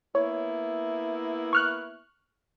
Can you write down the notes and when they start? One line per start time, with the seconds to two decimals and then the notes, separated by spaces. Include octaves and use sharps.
0.15 A#3 B3 E4 C#5
1.53 C#6 F6 F#6